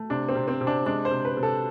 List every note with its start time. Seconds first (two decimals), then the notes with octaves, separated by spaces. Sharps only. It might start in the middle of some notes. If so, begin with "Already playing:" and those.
Already playing: A3
0.10 C3 D4
0.29 C4
0.35 C3
0.48 C4
0.61 C3
0.67 D4
0.86 G#3 D4
1.05 C5
1.11 C3
1.25 B4
1.37 C3
1.43 A4